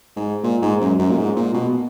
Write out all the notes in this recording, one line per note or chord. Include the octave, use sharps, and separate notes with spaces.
G#2
A#2
G#2
F#2
F#2
A#2
G#2
A#2
B2